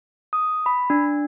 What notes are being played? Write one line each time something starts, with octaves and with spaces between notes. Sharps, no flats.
D#6
B5
D4